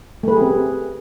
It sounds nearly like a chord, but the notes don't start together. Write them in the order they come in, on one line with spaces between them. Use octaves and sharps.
A3 B4 G#4 G4 C4